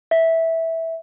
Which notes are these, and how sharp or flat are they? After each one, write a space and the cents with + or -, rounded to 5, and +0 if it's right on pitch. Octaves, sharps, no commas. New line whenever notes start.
E5 -10